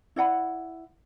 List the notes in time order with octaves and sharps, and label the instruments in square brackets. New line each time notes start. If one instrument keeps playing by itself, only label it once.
[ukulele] E4 D5 F#5 B5